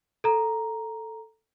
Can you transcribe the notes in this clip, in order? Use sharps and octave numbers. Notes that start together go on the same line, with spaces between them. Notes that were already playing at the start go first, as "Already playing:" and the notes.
A4 A#5